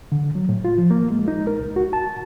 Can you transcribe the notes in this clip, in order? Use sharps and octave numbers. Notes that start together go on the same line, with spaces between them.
D3
F#3
A2
F4
F3
A#3
G#3
D#4
A#4
C2
F#4
A5